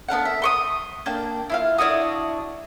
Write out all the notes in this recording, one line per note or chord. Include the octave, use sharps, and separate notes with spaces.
B3 D4 F5 F#5
E5
C6 C#6 D#6
A#3 D4 G5
E4 F4 F5
D4 E4 F#4 D#6